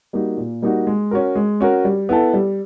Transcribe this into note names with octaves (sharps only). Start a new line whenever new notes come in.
G3 A#3 D#4 F#4
A#2
G3 A#3 D#4 F#4
G#3
C#4 F#4 A#4
G#3
C#4 F#4 A#4
G3
B3 E4 A4
G3